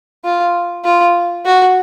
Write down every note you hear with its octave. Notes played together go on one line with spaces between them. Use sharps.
F4
F4
F#4